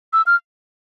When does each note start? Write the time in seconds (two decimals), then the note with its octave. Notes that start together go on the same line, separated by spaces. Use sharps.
0.13 E6
0.26 F6